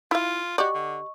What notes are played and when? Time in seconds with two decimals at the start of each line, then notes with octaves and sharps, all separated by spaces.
0.11 E4 F4 F5
0.58 F#4 G4 D5 D#5 C#6
0.74 D3